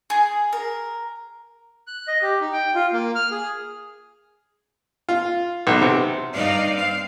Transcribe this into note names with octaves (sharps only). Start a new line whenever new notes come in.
G#4
A#4
F#6
D#5
G4
D#4
G5
F4
A#3
F6
G#4
F4
B1
C3
G2 D#4 D5 F5
C4 F5